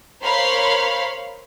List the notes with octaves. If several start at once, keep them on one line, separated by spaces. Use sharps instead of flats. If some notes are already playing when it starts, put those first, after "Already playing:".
A#4 C5 C#5 F5 B5 C6